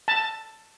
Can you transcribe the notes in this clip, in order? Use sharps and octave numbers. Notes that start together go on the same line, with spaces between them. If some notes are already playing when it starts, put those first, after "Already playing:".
A5